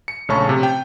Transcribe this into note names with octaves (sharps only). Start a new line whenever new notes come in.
C#7
A#1 C#3 A3 C#4 A5 C#6
C3
G5